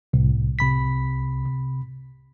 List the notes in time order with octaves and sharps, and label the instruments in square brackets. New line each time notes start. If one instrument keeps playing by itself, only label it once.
[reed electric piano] C2 [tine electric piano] A2
[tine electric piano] C3 B5 B6